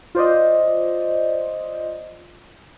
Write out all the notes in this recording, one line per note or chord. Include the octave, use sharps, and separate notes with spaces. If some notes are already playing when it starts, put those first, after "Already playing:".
F4 C5 D5 D#5